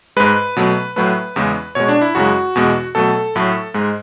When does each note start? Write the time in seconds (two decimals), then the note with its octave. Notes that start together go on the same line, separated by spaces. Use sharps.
0.17 G#2 G#3 B4
0.56 B2 F#3 A3
0.96 A2 F#3 A3 B4
1.36 E2 C#3 G#3
1.75 B2 G#3 C#5
1.89 D4
2.02 E4
2.15 F#2 C#3 G#3 F#4
2.55 E2 B2 G#3
2.95 B2 F#3 A3 A4
3.36 A2 F#3 A3
3.74 G#2 G#3